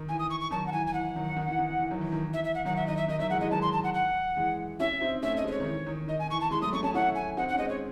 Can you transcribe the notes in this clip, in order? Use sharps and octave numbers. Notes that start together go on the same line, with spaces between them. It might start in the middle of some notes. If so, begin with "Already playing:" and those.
Already playing: D#3
E3 G#5
D#6
C#6
C#6
D#3 F#3 A5
F#5
E3 G#5
G#5
E3 F#5
D#3 F#3
D#3
E3
D#3
D#3
E3
D#3 F#3
E3
D#3
E3
E5
E5
F#5
D#3 F#3 F#5
E5
D#3 F#3 D#5
E5
D#3 D#5
D#3 F#3 E5
E3 G#3 F#5
E3 G#3 D#5
D#3 F#3 A5
C6
A5
F#5
F#5
E3 G#3
C#4 E4 E5
C4 D#4
A3 C#4 E5
D#5
G#3 C4
D#5
C#5
D#3
E3
D#3
D#3 D#5
G#5
E3 C#6
A5
E3 G#3 C6
F#3 A3 D#6
A3 C#4 C#6
A3 C#4 A5
C#4 E4 F#5
G#5
C4 D#4 F#5
F#5
C#4
G#3 C4 D#5
C#5